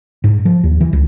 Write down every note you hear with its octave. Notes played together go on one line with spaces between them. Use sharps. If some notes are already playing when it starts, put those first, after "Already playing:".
G#2
F3
D#2
E3
C#2